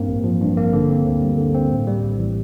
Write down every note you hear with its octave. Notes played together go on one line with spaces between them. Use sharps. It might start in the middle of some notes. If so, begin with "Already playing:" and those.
Already playing: G2 A#3 C4
A1
F3
G2
A#3
D3
C4
D2
G3
D3
C4
A2
G3
A#1
E3